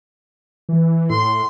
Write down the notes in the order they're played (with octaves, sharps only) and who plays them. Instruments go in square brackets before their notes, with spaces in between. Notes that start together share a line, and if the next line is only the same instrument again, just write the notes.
[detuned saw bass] E3
[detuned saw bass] A2 [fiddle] C6